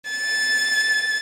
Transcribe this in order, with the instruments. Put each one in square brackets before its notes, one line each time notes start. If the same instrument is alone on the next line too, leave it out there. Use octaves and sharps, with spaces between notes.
[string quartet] A6